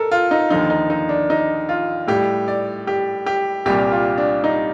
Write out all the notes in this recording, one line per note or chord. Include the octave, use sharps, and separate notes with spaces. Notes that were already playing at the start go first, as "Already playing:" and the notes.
Already playing: A4 A#4
F4
D#4
D#2 D3 F3 D#4
D#4
D#4
D4
D#4
F4
A2 G3 G4
D5
G4
G4
C2 A#2 G3 G4
F4
D4
D#4